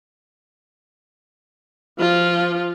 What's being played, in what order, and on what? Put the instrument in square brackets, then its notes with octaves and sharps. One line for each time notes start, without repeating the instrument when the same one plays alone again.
[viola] F3 F4